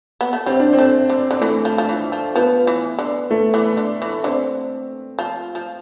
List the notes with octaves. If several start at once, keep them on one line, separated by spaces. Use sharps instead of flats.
B3
A3
G3 C4
D4
C4
A3
D3
D3
E3 A3
F3
F3
E3
F3
F3 B3
E3
D3
A3
E3
D3
E3
D3 C4
F3
F3